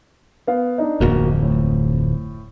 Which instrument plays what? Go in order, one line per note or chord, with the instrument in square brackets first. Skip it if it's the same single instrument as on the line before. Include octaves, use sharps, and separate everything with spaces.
[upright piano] B3 F5
D4 D#4
[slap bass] D1 F2 [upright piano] A#3 F#4
[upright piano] A2